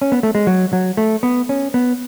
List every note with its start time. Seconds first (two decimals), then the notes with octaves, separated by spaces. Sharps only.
0.01 C#4
0.12 B3
0.23 A3
0.35 G#3
0.47 F#3
0.73 F#3
0.97 A3
1.23 B3
1.49 C#4
1.74 B3